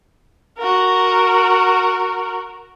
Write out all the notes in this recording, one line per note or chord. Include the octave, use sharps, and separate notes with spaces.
F#4 A#4